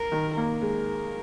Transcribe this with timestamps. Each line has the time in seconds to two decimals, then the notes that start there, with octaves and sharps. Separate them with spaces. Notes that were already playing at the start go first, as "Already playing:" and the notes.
Already playing: A#4
0.12 D#3
0.37 A#3 A#4
0.62 G#3